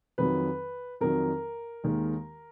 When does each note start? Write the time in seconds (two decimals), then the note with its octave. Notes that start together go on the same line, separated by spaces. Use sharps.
0.18 F2 D#3 F#3 B4
1.01 F2 D#3 F#3 A#4
1.84 D#2 D#3 G#3